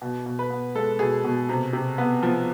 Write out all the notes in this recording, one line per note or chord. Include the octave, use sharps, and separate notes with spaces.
B2
B2
B4
B3
G#3 A4
B2 G#4
B2
C3
C3
B3
F3